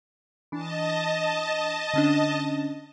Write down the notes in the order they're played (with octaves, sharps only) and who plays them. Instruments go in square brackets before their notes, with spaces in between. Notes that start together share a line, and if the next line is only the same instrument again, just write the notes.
[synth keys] E3 D4 [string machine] D#5 A5
[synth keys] D3 C#4 D4